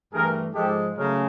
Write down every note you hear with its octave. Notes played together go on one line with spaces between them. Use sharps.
G2 E3 A3 G#4 A#4
G#2 F3 G#3 G4 A4
C#3 F#3 A3 C#4 G#4 A#4